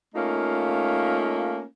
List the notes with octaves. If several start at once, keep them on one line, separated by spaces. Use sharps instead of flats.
A3 A#3 C#4 D#4 F4